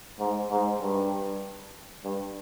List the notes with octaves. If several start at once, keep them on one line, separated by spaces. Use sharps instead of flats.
G#2
G#2
G2
G2